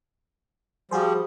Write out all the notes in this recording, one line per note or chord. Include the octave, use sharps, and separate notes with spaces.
F3 G3 F#4 G#4 C5